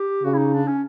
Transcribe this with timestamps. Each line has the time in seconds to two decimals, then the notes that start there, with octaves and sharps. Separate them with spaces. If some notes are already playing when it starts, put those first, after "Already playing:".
Already playing: G4
0.23 C#3 F#4
0.34 E4
0.38 D#4
0.53 D4
0.68 C#4